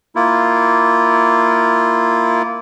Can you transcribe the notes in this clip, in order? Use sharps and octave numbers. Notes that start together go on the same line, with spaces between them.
A#3 E4 F4